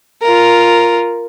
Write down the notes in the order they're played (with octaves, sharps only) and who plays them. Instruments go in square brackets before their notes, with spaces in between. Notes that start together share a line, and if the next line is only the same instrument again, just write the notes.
[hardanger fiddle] F4 A#4